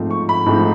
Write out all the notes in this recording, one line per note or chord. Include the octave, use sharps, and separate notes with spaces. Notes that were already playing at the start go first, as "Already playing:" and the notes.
Already playing: G#2 F3 A3 C4
C#6
B5
G#2 F3 A3 C4